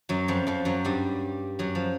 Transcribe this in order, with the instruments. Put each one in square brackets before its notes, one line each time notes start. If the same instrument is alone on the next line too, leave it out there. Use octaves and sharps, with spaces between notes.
[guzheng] F#2 F#3
F2 F3
F2 F3
F#2 F#3
G2 G3
F#2 F#3
F3